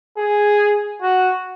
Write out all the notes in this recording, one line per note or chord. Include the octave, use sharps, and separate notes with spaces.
G#4
F#4